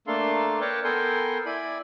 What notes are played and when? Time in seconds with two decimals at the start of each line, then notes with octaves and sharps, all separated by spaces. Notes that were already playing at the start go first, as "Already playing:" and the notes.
0.07 A3 A#3 D4 A4 F5 C6
0.61 A#4 B4 C#5 D5 G5 A5
0.84 B3 A4 A#4 G5 G#5 C6
1.46 E4 D5 G#5 B5